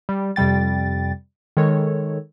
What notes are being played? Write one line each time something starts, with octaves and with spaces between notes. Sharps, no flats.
G3
F2 C3 G3 G5 A6
D#3 G#3 A4 C#5